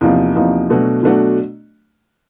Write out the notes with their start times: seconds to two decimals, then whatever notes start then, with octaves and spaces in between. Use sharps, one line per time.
0.01 E2 C3 F3 A#3 D#4
0.35 E2 C3 F3 A#3 D#4
0.70 B2 F#3 A3 D4 F#4
1.03 B2 F#3 A3 D4 F#4